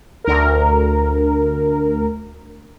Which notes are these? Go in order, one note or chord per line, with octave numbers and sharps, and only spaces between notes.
D2 A#4